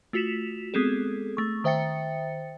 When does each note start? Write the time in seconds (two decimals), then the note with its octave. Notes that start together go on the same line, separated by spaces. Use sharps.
0.13 A3 F4 F#4 B6 E7 F7
0.74 G#3 B3 C4 G#4 A4
1.37 A3 C#6
1.64 D#3 C5 E5 G5 A6 C#7